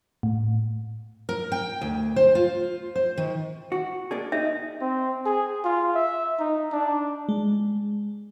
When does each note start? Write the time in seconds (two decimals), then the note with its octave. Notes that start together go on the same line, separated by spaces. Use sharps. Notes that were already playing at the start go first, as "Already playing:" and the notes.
0.23 A2
1.29 A#4
1.52 G5
1.81 D2
2.16 C5
2.35 F4
2.95 C5
3.17 D#3
3.72 F#4
4.11 A#3 D4 G#4
4.32 D#4 E5
4.81 C4
5.25 G#4
5.64 F4
5.95 E5
6.39 D#4
6.72 D4
7.29 G#3